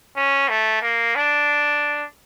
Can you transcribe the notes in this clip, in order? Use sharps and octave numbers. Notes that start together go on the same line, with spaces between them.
C#4
A3
A#3
D4